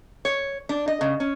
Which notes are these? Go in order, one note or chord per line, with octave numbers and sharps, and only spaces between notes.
C#5
D4
D#5
C#3
C#4